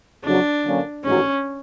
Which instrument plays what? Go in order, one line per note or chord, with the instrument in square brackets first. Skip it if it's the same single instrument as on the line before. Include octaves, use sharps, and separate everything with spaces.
[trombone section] F2 C#3 F#3 [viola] D4
[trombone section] D3 F#3 A#3 C#4
[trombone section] A1 G#2 D#3 F#3 [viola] C#4